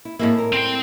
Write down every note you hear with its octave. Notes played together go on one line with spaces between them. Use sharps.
E4
A2 G#3 A#3 C4 E4
A#4
C4 G5